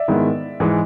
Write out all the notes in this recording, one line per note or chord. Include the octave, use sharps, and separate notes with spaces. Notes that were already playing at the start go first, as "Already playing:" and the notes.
Already playing: D5 E5
G#2 D#3 G#3 B3 E4
G#2 E3 G#3